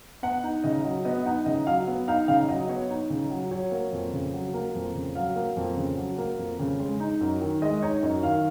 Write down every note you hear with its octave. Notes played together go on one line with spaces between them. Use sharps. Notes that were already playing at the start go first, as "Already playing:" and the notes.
B3 F#5
D#4
C#3 D#5
F#3
B3 D#5
D#4 F#5
C#3 D#5
F#3 F5
B3
D#4 F5
C#3 F5
F#3 D#5
B3 C#5
D#4
C#3
F#3
F#3 C#5
A#3
F2
C#3
F#3
A#3
F2
C#3
F#3 F5
A#3
F2
C#3
F#3
A#3
F2
C#3
G#3
D#4
F#2
D#3
G#3 D#5
D#4 C#5
F#2 D#5
D#3 F5